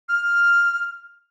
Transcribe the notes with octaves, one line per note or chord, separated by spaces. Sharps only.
F6